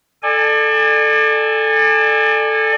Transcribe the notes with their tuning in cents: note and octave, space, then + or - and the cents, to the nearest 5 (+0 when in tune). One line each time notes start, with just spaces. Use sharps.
A4 +0 D5 +30 G#5 -25